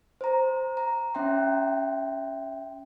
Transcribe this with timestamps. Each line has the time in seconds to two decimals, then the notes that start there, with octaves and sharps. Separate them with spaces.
0.21 C5 A#5
0.77 A#5
1.14 C#4 E5 G5 C6